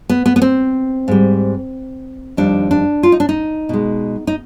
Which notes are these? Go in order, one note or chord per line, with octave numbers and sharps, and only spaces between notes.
B3
B3
B3
C4
G#2 G3
F2 D#3 G3 D4
D4
F4
D#4
D4
D#4
B2 G#3
D#4